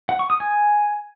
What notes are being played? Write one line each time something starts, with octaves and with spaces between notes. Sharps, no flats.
F#5
C#6
D#6
G#5